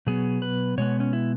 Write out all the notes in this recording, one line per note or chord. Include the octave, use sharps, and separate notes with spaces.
B2 F#3 B3 G#4
B4
B2 G#3 B3 C#5
C#4
E4